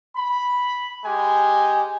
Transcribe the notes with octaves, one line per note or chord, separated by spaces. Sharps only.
B5
G#3 G4 G#5